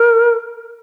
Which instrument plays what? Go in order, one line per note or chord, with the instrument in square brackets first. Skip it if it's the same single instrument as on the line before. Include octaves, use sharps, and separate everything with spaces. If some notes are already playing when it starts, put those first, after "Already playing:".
Already playing: [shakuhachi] A#4